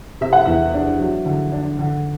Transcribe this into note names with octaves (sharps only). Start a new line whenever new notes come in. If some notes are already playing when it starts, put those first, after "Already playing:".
C3 E5
F#5
E2 E5
D4
F#3
D3
D4
D3